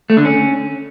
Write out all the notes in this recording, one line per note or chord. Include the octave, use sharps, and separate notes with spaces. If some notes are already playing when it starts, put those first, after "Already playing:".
A3
D3
C#4